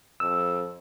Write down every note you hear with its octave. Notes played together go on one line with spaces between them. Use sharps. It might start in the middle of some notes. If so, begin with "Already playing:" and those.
F2 E6